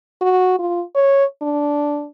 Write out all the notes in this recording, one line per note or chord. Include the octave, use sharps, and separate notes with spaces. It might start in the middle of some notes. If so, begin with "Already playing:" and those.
F#4
F4
C#5
D4